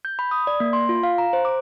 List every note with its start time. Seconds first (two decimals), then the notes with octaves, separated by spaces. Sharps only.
0.05 G6
0.19 B5
0.31 D#6
0.47 D5
0.60 A#3
0.73 C6
0.89 F4
1.03 F5
1.18 A#5
1.33 C5
1.45 D6